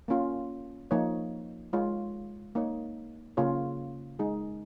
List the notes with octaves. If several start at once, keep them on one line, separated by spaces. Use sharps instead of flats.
A#3 C#4 F4
F3 A#3 D#4 C#5
G#3 F4 C#5
A#3 D#4 C#5
C#3 A#3 F4 C#5
G#3 D#4 G#4